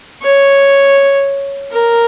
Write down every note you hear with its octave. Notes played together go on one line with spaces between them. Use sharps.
C#5
A#4